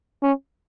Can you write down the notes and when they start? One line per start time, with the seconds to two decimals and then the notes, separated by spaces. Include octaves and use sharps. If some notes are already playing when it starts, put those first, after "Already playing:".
0.23 C#4